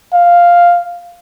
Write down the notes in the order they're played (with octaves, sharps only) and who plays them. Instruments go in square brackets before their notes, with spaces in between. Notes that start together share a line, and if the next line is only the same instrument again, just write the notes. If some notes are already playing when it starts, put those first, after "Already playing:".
[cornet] F5